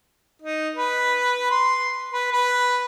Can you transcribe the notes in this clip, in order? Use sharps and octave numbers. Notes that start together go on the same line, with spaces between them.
D#4
B4
C6
B4
B4